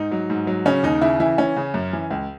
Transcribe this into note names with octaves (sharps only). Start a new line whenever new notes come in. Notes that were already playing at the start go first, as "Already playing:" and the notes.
Already playing: G#2 D#4
F#3
G#2
F#3
C#3 C#4
D#2 D#4
C#3 E4
E3 E4
E3 C#4
C#3
F#2
E3
C#2